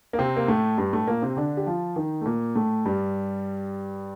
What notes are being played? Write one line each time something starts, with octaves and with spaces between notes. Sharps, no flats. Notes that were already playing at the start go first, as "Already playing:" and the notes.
A#3
C3 C4
A#3
A2 A3
G2 G3
A2 A3
A#2 A#3
C3 C4
D3 D4
G4
F3 F4
D#3 D#4
A3
A#2 A#3
A2 A3
G2 G3